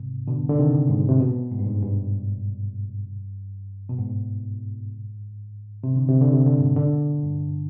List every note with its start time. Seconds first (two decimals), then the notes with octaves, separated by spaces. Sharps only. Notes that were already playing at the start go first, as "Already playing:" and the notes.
Already playing: G#2 C3
0.27 B2 D3
0.49 D3
0.59 C3 D#3
0.89 G#2
1.09 C3
1.19 B2
1.51 G#2
1.59 G2
1.67 G#2
1.82 G2
3.89 B2
3.99 G#2
5.83 C3
5.96 D3
6.08 C3
6.21 D3
6.33 C3
6.46 D3
6.58 G#2 C3
6.76 B2 D3
7.23 G2